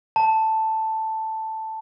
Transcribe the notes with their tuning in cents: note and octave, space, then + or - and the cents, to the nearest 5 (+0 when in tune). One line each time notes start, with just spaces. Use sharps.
A5 +5